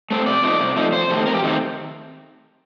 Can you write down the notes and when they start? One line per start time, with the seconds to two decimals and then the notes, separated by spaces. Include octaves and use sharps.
0.11 A3 C4
0.26 C3 D5
0.43 F3 A3 D#4
0.60 C3
0.76 F3 A3 D#4
0.92 F2 C5
1.10 C3 D#3 A3 C4
1.26 F2 A#4
1.34 G4
1.43 C3 D#3 A3 C4